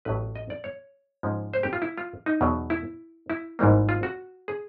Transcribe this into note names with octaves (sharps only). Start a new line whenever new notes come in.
A1 A2 F#3 B4
D#5
D5
C#5
G#2 F3 G#3 C#4
C5
G4
F4
E4
F4
D#4
E2 B2 F#3
E4
E4
G#1 G#2 E3 G3 A#3
F4
F#4
G#4